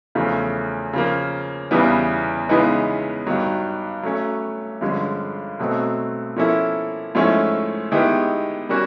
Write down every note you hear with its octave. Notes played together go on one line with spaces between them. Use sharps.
E2 C#3 F3 A3
C#3 F3 A#3
E2 C#3 E3 G3 B3
C#3 E3 G#3 B3 D#4
G2 D#3 F#3
F#3 A3 C#4
G2 D3 F3 G#3 C#4
B2 F#3 A3 C4
F3 A#3 C#4 E4 A4
G#2 F3 A3 C#4 E4
D#3 G#3 B3 E4 G4
G3 A#3 C#4 F#4